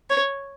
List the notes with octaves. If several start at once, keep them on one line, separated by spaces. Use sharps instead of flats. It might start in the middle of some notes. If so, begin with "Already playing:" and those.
C#5